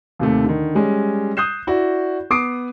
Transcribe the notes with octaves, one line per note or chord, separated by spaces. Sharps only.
D#2 C3 A3
D3 D#3
G3 G#3 C#4
D#6 F#6 G6 C7 E7
E4 F#4 D5
B3 D6 D#6 C7 D7